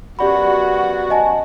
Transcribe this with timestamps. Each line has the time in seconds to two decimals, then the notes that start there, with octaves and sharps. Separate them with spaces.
0.19 F#2 B3 F#4 G4 D5 B5
1.10 D#5 G#5 A5